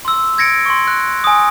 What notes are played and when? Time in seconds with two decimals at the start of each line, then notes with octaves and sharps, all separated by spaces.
0.05 C6 E6
0.38 G#6 A#6 C#7 D7
0.66 C6 C#6
0.88 F#6
1.24 G#5 D#6